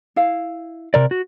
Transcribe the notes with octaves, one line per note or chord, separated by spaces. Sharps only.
E4 F5
C3 A#4 D5
F#4